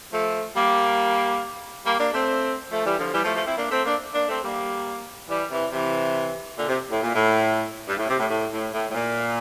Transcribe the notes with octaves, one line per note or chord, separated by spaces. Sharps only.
F3 A3
G3 A#3
G3 A#3
A#3 D4
A3 C4
F3 A3
E3 G3
D3 F3
E3 G3
F3 A3
F3 A3
C4 E4
A#3 D4
A3 C4
A#3 D4
A#3 D4
A3 C4
G3 A#3
E3 G3
C3 E3
C3 E3
A#2 D3
C3
A2
A#2
A2
G2
A2
C3
A2
A2
A2
A2
A2
A#2